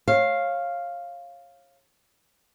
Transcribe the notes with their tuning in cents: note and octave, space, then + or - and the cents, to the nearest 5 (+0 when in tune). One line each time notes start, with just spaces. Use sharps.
C#5 -25 F5 +0